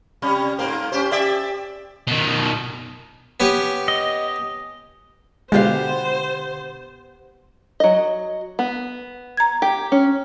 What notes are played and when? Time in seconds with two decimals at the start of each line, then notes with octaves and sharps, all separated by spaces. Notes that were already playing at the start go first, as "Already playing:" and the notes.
0.22 C3 G3 C#4
0.59 G#2 A#3 C5
0.92 C#4 G4 C5
1.11 G4 D5 E5
2.07 B2 D#3
3.40 B3 C#4 G4
3.88 D#5
5.52 B2 D3 G#3 B3 F4 G4 C5 F5
7.80 F#3 D#5
8.59 B3
9.37 A#5 G#6
9.62 G4
9.92 C#4